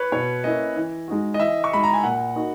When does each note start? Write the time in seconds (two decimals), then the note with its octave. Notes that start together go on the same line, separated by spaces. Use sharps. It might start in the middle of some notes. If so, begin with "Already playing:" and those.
Already playing: B4 C#5
0.12 B2 C#5
0.44 A#3 C#4 E4 D#5
0.76 E3
1.08 G#3 D#4 F#4
1.34 D#5
1.40 E3 E5
1.64 C#6
1.72 G#3 D#4 F#4 B5
1.84 A#5
1.93 G#5
2.03 A#2 F#5
2.36 A#3 D#4 F#4